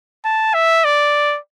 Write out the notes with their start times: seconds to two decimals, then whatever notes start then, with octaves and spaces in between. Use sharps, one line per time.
0.25 A5
0.54 E5
0.84 D5